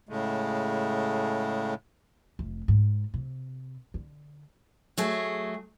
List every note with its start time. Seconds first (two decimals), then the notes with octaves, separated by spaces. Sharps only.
0.09 A2 C#3 G#3 A3
2.39 F1
2.68 G#2
3.14 C3
3.94 D3
4.98 F#3 A3 G#4